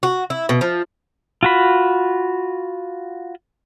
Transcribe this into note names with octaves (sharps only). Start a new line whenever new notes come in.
F#4
E4
B2
F3
F4 F#4 B5